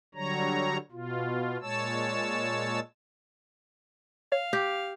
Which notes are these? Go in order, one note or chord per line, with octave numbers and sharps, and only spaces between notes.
D3 F#3 G3 C#5 A#5
B2 F4
A#2 G#3 C#5 A5 E6
C#5 F5
G4